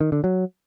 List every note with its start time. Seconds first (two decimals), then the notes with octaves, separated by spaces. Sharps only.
0.01 D#3
0.12 D3
0.24 F#3